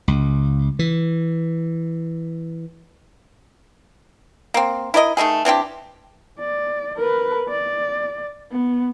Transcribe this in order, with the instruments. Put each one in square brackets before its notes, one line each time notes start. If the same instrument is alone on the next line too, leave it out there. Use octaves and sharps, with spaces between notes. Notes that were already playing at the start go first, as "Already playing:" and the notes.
[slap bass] C#2
E3
[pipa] A#3 C4
E4 A#4 D5 D#5
D#3 A3 A#3 G#4
E3 C4 D4 G4
[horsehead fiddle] D5
A#4 B4
D5
B3